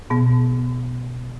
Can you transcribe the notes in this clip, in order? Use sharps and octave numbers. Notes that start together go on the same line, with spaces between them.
B2 B3